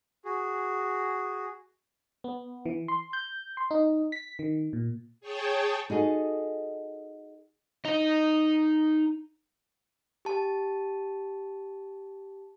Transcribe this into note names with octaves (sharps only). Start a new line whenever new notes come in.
F#4 G#4
B3
E3
C6
G6
C6
D#4
B6
D#3
A#2
G#4 C#5 G5 A5
D#4 F#4 G#4 A4
D#4 D#5
G4 A5